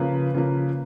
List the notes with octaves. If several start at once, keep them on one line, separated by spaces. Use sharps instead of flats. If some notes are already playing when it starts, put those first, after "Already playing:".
Already playing: C#3 F3 A#3 B4
C#3 F3 A#3